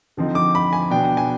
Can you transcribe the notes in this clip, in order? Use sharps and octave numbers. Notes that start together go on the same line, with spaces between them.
D3 F3 C4 D#4
D6
B5
G#5
B2 B3 D4 G5
G#5